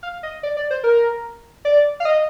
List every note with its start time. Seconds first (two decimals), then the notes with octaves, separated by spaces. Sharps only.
0.03 F5
0.23 D#5
0.43 D5
0.57 D5
0.70 C5
0.84 A#4
1.65 D5
2.00 F5
2.05 D#5